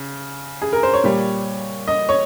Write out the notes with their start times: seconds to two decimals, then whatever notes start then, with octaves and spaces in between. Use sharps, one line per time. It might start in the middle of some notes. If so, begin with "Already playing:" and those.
Already playing: C#3
0.62 G#4
0.73 A#4
0.83 C5
0.93 C#5
1.04 A#2 G3
1.88 D#5
2.09 C#5